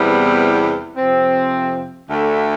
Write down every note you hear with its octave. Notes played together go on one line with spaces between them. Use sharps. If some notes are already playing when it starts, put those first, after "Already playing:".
Already playing: E2 C3 G3 B3 E4
F2 C3 F3 C4
D2 D3 A3